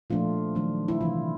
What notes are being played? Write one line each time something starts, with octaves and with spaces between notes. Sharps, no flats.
A#2 F3 A3 D4 F4
D#3 F#3 A3 D4
E4
C3 E3 A3 D4 F4